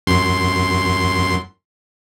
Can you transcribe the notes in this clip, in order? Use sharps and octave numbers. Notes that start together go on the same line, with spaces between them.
F#2 C6